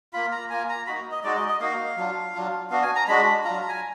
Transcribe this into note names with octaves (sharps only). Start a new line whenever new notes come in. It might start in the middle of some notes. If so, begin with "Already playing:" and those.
A#3 F4 B5
A#5
A#3 F4 G#5
A#5
A#3 D#4 F#4 B5
D#5
G#3 D#4 F#4 D5
D#5
D#5
A#3 D#4 F#4 F5
F#3 D4 F4
F#3 D4 F4
B3 D4 F#4 F5
G#5
A#5
G#3 D4 F#4 B5
F#3 D4 F4 A#5
G#5